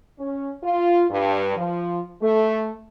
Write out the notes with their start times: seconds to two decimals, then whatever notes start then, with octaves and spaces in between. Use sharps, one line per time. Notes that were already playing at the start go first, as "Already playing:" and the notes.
0.19 C#4
0.64 F4
1.10 G2
1.56 F3
2.22 A3